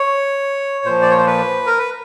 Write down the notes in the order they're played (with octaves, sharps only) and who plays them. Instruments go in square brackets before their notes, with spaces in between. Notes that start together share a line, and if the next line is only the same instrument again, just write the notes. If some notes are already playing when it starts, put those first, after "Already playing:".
Already playing: [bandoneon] C#5
A#2 F3 C5
D5
C#5
C5
B4
A#4
B4